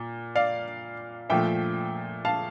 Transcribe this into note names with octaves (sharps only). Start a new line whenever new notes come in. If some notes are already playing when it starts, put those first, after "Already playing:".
Already playing: A#2
D5 F5
A#2 F3 A3 E5 G5
F5 A5